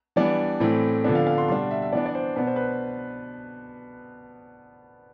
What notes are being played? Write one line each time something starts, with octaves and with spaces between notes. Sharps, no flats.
E3 G3 B3 D4 D5
A2 E3 A3 C4
D3 F3 B3 D4
F5
F5
C6
B2 G3 D4 C6
E5
E5
E3 B3 D4 D5
D5
C5
B2 B3 D4 B4
C5
B4